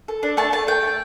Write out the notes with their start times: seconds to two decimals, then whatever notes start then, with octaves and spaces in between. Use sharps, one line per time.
0.08 A4
0.23 D4
0.37 A3 A5
0.53 A3 A5
0.67 A3 G5
0.83 A3